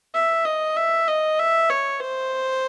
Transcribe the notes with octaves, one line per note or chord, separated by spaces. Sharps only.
E5
D#5
E5
D#5
E5
C#5
C5